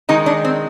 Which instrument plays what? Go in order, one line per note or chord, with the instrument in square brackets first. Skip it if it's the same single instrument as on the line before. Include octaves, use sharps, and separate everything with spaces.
[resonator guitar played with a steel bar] D#3 G#3 D#4
D4
C4